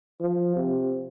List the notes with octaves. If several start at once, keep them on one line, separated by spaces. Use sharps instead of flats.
F3
C3